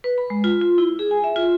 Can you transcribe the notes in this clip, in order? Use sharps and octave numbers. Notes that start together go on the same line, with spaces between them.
B4
B5
G#3
F4
F4
E4
G#4
G#5
E5
F4